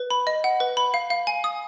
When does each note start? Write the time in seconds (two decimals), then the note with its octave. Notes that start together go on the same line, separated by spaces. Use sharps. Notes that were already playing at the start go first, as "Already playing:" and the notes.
Already playing: B4
0.11 B5
0.27 D#5
0.44 F#5
0.60 B4
0.77 B5
0.94 F5
1.10 F5
1.27 G#5
1.44 D#6